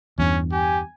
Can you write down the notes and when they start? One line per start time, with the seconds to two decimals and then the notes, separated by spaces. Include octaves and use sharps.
0.19 E2 G2 C#4
0.52 G4 G#5